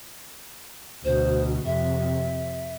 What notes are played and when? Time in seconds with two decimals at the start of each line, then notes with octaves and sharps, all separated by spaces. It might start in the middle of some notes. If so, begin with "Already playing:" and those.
1.05 D2 B2 C5
1.65 F2 C3 E5